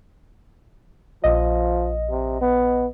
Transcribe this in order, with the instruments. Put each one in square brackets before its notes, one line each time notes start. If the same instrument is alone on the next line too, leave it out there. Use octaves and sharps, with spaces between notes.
[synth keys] A#1 D#5 [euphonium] F3
[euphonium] C3
B3